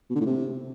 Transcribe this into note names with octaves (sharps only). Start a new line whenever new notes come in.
B2
D3
A2
C3